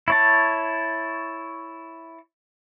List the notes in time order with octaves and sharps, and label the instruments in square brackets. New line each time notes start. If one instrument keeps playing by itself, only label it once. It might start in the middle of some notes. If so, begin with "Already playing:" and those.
[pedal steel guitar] E4 C#5 A5